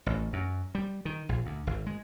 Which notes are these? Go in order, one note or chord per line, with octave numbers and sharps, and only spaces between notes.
A1
F#2
G3
D#3
A#1
D2
G#1
G#3